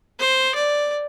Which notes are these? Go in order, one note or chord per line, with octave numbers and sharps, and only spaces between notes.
C5
D5